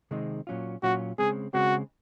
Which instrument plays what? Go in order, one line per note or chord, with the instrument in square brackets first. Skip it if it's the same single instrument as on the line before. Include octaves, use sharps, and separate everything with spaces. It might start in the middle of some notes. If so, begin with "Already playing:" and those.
[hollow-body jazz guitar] C3 D#3 G#3 C4 D#4
A#2 F#3 C#4 F4
[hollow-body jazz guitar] A#2 F#3 C#4 F4 [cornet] F#4
[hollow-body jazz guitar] C#3 G#3 C4 [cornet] G#4
[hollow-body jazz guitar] C#3 G#3 C4 [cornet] F#4